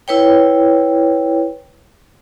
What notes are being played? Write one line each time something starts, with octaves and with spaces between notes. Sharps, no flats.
E4 B4 C#5 G5